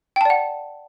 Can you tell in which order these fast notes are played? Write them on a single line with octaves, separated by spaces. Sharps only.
G5 A5 D5 F#5